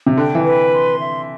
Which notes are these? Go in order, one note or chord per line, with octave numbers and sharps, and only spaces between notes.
C3
D3 G5
E3
B4
C6
E5